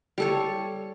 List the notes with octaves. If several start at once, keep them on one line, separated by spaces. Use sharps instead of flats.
G3 A4 C#5